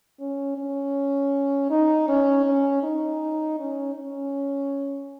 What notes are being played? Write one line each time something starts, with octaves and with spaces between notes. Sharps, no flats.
C#4
C#4
D#4
C#4
C#4
D#4
C#4
C#4